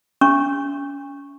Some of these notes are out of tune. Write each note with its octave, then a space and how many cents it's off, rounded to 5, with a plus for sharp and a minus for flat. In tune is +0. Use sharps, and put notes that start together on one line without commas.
C#4 +35 C#6 -10